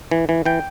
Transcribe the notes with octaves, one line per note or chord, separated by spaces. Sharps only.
E3
E3
E3 G5